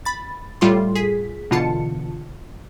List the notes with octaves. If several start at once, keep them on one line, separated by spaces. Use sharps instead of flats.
B5 A6
A2 G3 F4 A4 C6
G#4 B6
B2 D3 E3 F4 A5 C#7